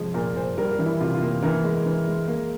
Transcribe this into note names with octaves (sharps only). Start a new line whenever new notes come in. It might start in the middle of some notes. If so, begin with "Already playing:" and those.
Already playing: C3 F3 G#3 F4 G#4
A#2 A#4
A#2 C5
G3 A#4
A#4
E3
E4
C3 F4
F4
A#3
E3 A#4
G#3
E3
G#3
A#3